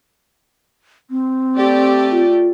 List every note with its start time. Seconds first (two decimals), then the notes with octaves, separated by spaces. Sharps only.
1.10 C4
1.57 A3 G4 D5
2.12 F4